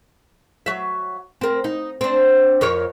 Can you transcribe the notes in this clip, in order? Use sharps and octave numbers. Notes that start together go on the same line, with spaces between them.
F#3 E5
C4 A#4
D#4
C4 D4
F2 A#4 C#5